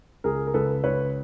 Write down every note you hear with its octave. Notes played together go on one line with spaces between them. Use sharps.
C#2 G#4 A#4
A#4
C#2 A4 B4
C#2 B4 C#5